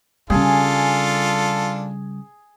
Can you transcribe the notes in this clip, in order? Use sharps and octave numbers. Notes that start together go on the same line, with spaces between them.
C#3 G3 D4 F4 G#4 A4 G#5